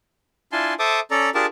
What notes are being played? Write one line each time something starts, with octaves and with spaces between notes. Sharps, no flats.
D4 E4 F4 G#5 A5 C6
A4 C5 E5 A5 D6 D#6
C#4 A4 D5 A#5
D4 F4 G4 G#4 A#4 A5